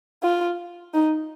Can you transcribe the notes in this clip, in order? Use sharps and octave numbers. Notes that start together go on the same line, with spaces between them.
F4
D#4